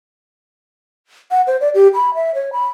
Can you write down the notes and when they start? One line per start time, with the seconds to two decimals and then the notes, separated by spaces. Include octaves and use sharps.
1.31 F#5
1.47 C5
1.61 D5
1.74 G4
1.95 B5
2.14 E5
2.35 C#5
2.53 B5